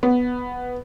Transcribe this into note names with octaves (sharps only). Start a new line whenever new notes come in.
B3